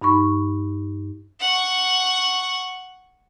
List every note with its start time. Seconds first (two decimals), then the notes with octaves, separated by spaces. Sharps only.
0.01 G2 D#4 B5 C#6
1.41 F#5 C#6